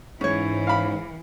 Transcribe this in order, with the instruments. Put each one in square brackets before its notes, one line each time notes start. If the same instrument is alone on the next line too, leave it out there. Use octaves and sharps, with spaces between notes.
[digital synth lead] G#2 [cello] E3 [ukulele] C#4 C#5
[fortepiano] F5 B5